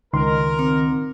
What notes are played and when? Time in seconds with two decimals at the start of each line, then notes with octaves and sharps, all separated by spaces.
0.13 C#2 D#3 A#4 C6
0.59 C4